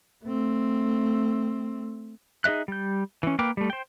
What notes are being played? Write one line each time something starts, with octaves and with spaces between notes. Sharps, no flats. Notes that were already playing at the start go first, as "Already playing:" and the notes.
A3 C4
D#4 G#4 D#5 E5 F#6
G3 G6
E3 C#4
A#3 A#4 B4 G5 D6
G3 A3
C5 G5